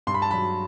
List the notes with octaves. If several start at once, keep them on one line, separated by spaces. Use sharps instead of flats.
G2 C6
B5
A5
F#3 B5